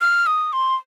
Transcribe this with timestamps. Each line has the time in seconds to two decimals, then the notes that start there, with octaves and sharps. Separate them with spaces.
0.01 F6
0.26 D#6
0.53 C6